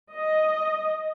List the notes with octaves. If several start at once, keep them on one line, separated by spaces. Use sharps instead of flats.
D#5